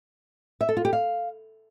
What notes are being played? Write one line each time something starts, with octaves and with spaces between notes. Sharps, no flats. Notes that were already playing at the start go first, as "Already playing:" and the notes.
E5
A4
F4
G4
F5